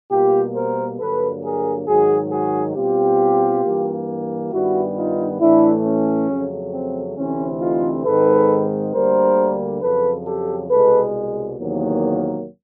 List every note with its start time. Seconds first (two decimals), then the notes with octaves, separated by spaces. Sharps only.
0.11 B2 G3 A#3 F4 G4
0.55 A#4 C5
1.00 G2 D3 F#3 A#3 A4 B4
1.44 G#4 A#4
1.88 G#2 D#3 F#3 F#4 G#4
2.32 F#4 G#4
2.76 B2 G3 C4 F4 G4
3.65 G2 E3 G3 A#3
4.52 G2 D#3 G3 B3 E4 F#4
4.97 D#4 F4
5.41 A2 E3 A3 D4 E4
5.85 C#4
6.29 F2 C#3 F#3 A3
6.73 C4
7.18 D2 C3 E3 A3 C4 C#4
7.61 D#4 F4
8.06 G#2 D#3 G#3 C4 A4 B4
8.94 D2 D3 G3 A#3 A#4 C5
9.82 F2 C#3 F#3 A4 B4
10.26 G4 A4
10.70 C2 B2 G#3 A4 B4
11.59 E2 C3 D#3 F#3 A#3